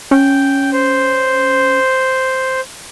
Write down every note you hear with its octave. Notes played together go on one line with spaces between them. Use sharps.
C#4 G5
C5